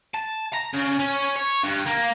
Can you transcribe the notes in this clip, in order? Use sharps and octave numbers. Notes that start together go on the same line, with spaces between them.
A5
A#5
C#3
C#4
C#5
G2
A#3